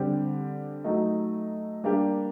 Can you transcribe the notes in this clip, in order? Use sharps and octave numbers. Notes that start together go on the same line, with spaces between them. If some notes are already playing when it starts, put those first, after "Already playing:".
Already playing: D3 G3 C4 G4
F#3 A3 D#4
G3 A#3 D4 G4